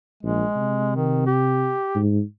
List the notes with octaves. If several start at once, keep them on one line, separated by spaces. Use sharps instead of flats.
A#1 G#3
C3
D#3
G4
G#2